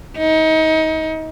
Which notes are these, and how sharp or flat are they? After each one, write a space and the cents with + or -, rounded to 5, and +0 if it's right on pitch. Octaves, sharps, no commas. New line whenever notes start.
D#4 +30